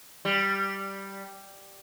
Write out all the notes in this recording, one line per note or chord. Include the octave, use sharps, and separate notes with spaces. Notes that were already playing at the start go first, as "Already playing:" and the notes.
G3